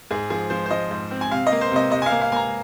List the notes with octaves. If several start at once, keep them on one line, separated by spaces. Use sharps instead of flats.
G#2 G#4
F3 G#4
F3 C5
C5
F3 D#5
G#2
C4
G#5
C3 F5
D#5
A#3
C5
C3 D#5
C3 D#5
G#5
F5
A#3
F5
A#3 G#5 A#5